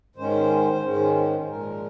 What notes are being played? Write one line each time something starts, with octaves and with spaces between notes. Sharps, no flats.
G#2 D#3 G#3 C#4 C5
G#2 D#3 G#3 C#4
A#2 F3 G#3 A#4